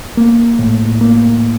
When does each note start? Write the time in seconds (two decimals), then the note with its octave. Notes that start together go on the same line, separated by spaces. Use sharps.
0.17 A#3
0.59 A2
1.01 A#3